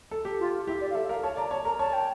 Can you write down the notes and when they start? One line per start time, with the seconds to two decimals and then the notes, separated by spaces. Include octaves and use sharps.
0.11 A4
0.25 G4
0.40 F4
0.67 E4 G4
0.81 D5
0.91 F5
0.95 A4 E5
1.09 A#4 F5
1.23 C#5 A5
1.37 D5 A#5
1.51 C#5 A5
1.65 A#4 A#5
1.79 C#5 A5
1.93 G5